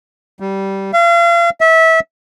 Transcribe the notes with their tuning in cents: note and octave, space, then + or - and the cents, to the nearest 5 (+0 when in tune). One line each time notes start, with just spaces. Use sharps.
G3 -15
F5 -40
E5 -25